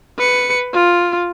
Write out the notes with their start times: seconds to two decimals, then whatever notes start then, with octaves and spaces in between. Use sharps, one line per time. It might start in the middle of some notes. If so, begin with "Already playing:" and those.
0.18 B4 C#7
0.73 F4